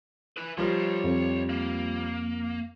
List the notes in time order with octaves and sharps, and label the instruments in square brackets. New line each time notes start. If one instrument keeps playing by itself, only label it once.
[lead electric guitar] E4 B4
[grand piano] F3 G3 A#4 [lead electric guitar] C#5 C6
[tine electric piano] F2
[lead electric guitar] A#3